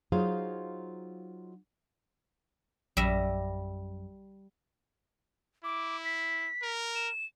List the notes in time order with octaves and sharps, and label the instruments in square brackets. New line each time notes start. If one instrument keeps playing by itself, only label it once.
[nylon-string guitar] F#3 D#4 F4 G#4 C5 F5
[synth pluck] A#1 E6 A#6 [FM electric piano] F#2 [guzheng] G3 E5
[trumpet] E4 [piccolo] D6
[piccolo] B6
[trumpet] A#4
[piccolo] E7